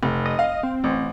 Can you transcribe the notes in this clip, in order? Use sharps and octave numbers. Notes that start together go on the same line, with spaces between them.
F1
D#5
F5
C4
A1